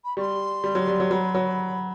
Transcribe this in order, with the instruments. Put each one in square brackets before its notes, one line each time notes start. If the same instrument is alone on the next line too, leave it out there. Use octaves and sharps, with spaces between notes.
[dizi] B5
[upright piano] G3 [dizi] C#6
[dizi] C6
[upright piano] G3
F#3
G3
F#3
[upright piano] F#3 [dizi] B5
[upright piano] F#3